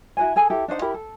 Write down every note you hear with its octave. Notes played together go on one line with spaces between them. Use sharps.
E4 F#4 C5 G#5
G#4 A4 G#5
E4 G4 A4
D4 D#4 C5 F#5
E4 G4 A#4 B5
A4